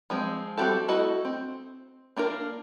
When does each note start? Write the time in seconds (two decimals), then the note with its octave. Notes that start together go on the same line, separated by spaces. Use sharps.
0.10 F3 G#3 C4
0.57 G3 C4 F#4 G4 A4
0.88 A3 E4 F#4 A4 D#5
1.25 C4
2.16 A#3 D4 F4 A#4